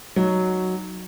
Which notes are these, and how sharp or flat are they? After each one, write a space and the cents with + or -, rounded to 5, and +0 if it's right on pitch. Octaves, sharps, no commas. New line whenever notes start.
F#3 +0 D#4 +0